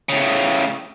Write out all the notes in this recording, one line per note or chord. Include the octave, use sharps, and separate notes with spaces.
A2 C#3